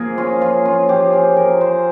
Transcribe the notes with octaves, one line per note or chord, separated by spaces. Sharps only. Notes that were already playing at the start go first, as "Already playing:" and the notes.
Already playing: F3 A#3 G#4 A#4
C#4 F4
F3 F4
C#4 F4
F3 G4
F3 G#4
F3 A#4
C#4 C5